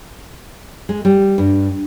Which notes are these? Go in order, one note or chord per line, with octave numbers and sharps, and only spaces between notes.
G#3
G3
G2